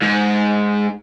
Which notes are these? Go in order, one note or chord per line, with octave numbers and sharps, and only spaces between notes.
G#2